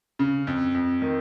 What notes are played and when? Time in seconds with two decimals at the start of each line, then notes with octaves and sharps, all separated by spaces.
0.19 C#3
0.47 F2
0.74 F2
1.02 D#3